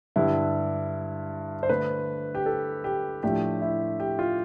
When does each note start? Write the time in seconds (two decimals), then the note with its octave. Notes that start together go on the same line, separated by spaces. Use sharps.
0.16 G2 D3 G3 D4 E4
1.63 C5
1.69 D3 A3 D4 B4
2.35 G4
2.46 A4
2.84 G4
3.23 A2 F3 A3 D4 G4
3.62 E4
4.00 G4
4.19 F4